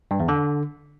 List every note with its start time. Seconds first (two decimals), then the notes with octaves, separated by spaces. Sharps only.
0.11 G2
0.20 E2
0.28 D3